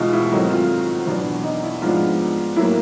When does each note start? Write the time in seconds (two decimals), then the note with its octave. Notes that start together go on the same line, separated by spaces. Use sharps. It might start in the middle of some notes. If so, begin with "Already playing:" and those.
Already playing: E2 B2 G#3 D#4 F4
0.13 E4
0.31 G#2 D#3 F#3 A3 C4 D#4
0.50 F4
1.07 E2 B2 F#3 B3 D4
1.44 D#4
1.63 E4
1.82 G#2 F3 G#3 B3 D4 F4
2.56 A2 F#3 A#3 E4